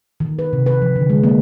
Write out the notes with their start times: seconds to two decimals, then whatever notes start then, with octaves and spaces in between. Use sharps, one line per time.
0.20 D#3
0.39 B4
0.53 C3
0.66 B4
0.82 F3
0.96 D3
1.10 G#3
1.24 A#3